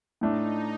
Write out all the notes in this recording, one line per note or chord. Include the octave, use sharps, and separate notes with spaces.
A2 A3 D4 D#4